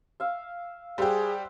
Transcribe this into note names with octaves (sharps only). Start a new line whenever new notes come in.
E5 F5
G3 G4 G#4 C5 E5 F#5